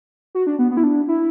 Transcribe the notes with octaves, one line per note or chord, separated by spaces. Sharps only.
F#4
D4
B3
B3
E4
D4
E4